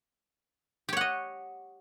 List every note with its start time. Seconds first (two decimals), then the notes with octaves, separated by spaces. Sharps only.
0.89 G4
0.93 C#5
0.97 F#5
1.01 D#5